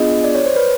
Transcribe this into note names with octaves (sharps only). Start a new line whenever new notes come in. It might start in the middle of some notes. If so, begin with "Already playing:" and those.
Already playing: B3 D4 F4 G#4 D#5
D5
C#5
C5
B4